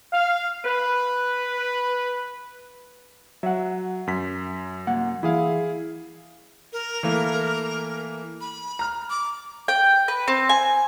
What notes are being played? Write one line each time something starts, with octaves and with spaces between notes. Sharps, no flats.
F5
B4
F#3 E5 F#5
F#2 B6
C2 A#3 F#5
E3 E4 G#4 F5
A#4
E3 A3 A#3
B5
A#5 F6
D6
G5
B4
C4
G#5